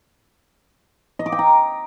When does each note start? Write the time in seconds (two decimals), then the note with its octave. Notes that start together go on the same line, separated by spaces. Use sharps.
1.19 D#5
1.26 D6
1.32 G5
1.39 A#5